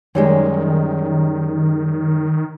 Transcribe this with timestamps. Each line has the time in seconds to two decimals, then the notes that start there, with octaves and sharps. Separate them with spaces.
0.15 F#2 D#3 G3 G#3